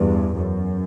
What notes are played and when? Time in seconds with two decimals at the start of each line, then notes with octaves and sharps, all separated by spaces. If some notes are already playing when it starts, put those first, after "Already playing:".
Already playing: E2 G2
0.35 F#2